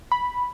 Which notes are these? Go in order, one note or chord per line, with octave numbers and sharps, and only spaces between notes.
B5